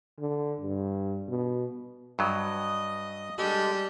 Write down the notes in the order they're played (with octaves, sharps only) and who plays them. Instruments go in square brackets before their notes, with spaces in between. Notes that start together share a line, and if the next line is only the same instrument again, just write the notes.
[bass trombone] D3
G2
B2
[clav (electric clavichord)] G2 F#3 [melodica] D#5 D#6
[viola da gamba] G3 D4 G4 [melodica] G#3 A4